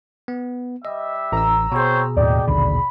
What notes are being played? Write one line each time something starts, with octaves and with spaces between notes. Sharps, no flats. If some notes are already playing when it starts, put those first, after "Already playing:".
B3
G3 D#5 E5
A1 A#5 E6
B2 C4 G#4 C5 C#5
D#2 A2 D#4 G4 D5
A#1 D#2 D3 B5